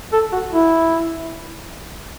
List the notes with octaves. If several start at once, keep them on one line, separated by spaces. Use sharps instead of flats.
A4
F#4
E4